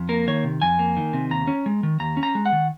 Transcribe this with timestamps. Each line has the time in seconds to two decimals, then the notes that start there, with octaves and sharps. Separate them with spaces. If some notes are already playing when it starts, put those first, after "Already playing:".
Already playing: F2
0.09 A#3 A#4
0.27 D#3 C#5
0.44 C3
0.62 F2 G#5
0.79 A#3
0.97 D#3
1.13 C3
1.31 D#2 A#5
1.47 C#4
1.66 G#3
1.83 D#3
2.00 D#2 A#5
2.17 C#4
2.23 A#5
2.35 G#3
2.46 F#5
2.52 D#3